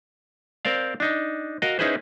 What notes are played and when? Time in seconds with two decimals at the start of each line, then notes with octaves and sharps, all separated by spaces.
0.65 C4 A#4 C5 D5 F5
1.00 D4 D#4
1.62 F#4 A#4 D#5 F5
1.79 C#4 D#4 E4 G#4 B4 C5